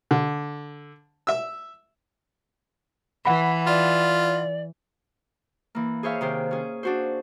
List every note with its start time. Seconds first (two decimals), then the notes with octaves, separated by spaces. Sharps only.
0.11 D3
1.27 E5 E6
3.25 E3 F#5 B5
3.67 F4 D5
5.75 E3 A#3
6.03 G#4 C5 C#5 E5 F5
6.21 C3 D#3 C5
6.51 C#4 G#4
6.83 D4 F#4 C5